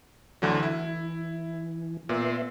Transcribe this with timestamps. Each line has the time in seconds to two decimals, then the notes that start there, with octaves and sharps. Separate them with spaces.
0.42 D2 D3 E3 F#3
0.63 E4
2.09 A#2 B3 E5 C6